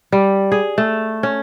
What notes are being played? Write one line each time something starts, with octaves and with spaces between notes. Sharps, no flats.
G3
G#4
A3
C#4